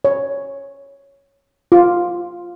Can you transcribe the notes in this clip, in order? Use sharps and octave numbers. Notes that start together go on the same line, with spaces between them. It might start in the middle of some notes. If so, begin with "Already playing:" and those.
C#5
F4